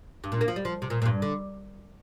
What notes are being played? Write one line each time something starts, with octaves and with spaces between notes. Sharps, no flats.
G2
A#2
A#3
F3
G3
F3
C3
A#2
A#2
G2
D3